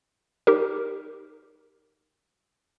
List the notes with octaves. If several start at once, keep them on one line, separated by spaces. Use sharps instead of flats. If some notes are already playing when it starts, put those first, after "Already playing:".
D#4 G4 A#4